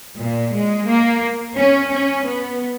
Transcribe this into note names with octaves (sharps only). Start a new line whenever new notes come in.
A#2
G#3
A#3
C#4
C#4
B3